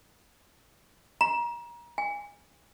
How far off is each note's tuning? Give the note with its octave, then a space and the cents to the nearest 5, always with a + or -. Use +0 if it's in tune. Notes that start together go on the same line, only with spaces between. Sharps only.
A#5 +30
G#5 -25